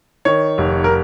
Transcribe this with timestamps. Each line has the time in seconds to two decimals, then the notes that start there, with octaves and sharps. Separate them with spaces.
0.25 D#3 C#5
0.58 F1
0.84 A#4